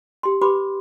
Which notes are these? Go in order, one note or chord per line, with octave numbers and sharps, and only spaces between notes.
G4 C6
G4 B4 B5 C6 D6